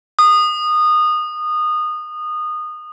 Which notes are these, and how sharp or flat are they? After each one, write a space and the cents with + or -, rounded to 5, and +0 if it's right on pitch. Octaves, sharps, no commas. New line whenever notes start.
D#6 -20